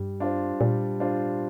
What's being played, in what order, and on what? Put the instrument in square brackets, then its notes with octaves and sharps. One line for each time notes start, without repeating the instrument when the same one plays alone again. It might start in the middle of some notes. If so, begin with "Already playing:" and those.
Already playing: [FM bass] G2 [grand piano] G3
[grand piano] D4 F4 C5
[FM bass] A#2 [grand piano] G3
[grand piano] D4 F4 C5